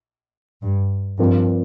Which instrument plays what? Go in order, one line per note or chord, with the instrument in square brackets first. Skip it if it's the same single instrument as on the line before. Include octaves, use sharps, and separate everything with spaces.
[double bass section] G2
[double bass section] G2 [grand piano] F3 C4 F4 A#4